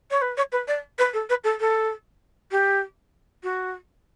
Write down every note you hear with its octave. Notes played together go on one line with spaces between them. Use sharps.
C#5
B4
C#5
B4
D5
B4
A4
B4
A4
A4
G4
F#4